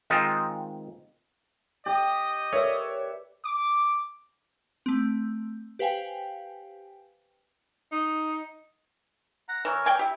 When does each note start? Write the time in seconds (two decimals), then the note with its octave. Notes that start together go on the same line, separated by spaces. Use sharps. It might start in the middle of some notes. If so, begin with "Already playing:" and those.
0.10 D#3 G#3 C4 D#4 F4
1.86 G4 D#5
2.53 A#4 B4 C#5 D5 E5
3.45 D6
4.86 A3 C4
5.79 G4 B4 C5 F5 G5 G#5
7.92 D#4
9.49 F#5 A#5
9.65 E3 A#4 C#5
9.86 D5 G5 G#5
9.99 E4 G4